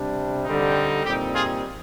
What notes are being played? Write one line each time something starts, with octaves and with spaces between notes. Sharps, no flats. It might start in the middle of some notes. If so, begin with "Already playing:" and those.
Already playing: C3 G3 D4
D3 G3 C4 D#4
A#2 G3 C4 D#4 G4
F4 G#4